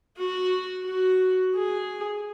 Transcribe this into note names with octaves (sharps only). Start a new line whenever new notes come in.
F#4
F#4
G#4